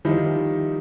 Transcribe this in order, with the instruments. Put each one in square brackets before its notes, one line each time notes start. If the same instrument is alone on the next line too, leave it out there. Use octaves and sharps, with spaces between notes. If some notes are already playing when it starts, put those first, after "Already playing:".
[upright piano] D#3 F3 G3 D#4 E4